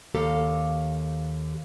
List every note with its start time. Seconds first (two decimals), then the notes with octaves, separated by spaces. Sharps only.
0.15 D#2 G4 A4 F5 A#5